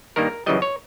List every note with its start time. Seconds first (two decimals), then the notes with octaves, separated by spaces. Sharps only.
0.16 G2 D#3 G3 A#3 A#4
0.46 F#2 C#3 E3 G3 D#5
0.62 C#5